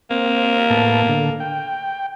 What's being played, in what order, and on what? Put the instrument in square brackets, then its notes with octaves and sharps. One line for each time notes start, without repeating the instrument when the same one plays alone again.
[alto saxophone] A#3 [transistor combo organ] C4
[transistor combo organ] A2 B3 A5
D3 A4
G5